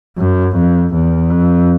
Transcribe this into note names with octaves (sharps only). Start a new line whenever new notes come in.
F#2
F2
E2
F2